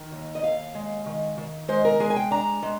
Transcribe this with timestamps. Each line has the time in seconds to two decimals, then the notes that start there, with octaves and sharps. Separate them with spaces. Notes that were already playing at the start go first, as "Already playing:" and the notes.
Already playing: D#3
0.12 D#2
0.35 D#5
0.43 D#2 F5
0.75 G#3
1.06 D#3
1.37 D#3
1.68 G#3 C5
1.85 A#4
2.00 G#3 G#4
2.10 G#5
2.16 G5
2.31 D4 A#5
2.63 G#3